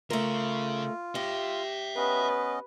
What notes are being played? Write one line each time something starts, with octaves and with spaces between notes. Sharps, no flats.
C#3 A3 F4 A#4
G4 C#5 E5
B3 C#4 B4 D#5